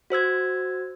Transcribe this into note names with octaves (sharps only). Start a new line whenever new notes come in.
F#4 C5 E6 G#6